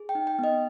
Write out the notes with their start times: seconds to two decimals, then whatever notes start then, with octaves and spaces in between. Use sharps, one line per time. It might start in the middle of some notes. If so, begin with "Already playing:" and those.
Already playing: G#4
0.09 G5
0.15 D#4
0.27 G5
0.39 B3 D#5